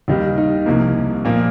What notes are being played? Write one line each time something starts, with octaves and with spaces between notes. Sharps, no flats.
D#2 D#3 G3 D#4
D#4
C2 C3 F3 A#3
A#2 F3 A#3